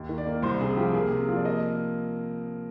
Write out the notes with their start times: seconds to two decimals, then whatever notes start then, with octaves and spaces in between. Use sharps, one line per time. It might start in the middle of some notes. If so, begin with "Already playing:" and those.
Already playing: D#2
0.09 D#3
0.18 D5
0.26 A#3
0.42 C2 C5
0.60 C3 G#4
0.77 F3 G4
0.94 A#3 G#4
1.11 C3
1.29 F3
1.36 D5
1.45 A#3 D#5